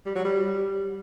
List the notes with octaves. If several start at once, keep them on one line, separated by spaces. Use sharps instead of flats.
G3
F#3
G3